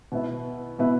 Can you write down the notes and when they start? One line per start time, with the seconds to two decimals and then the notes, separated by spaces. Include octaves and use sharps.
0.12 B2 B3 E4 B4
0.78 B2 B3 E4 B4